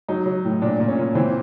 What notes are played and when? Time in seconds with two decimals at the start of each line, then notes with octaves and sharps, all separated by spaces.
0.08 F#3 D#4
0.26 F#3
0.45 A2
0.62 A#2 D4
0.80 A#2
0.88 C#4
0.98 A#2
1.15 E3 C4